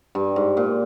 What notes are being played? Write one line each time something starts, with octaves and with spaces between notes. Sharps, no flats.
G2
G#2
A#2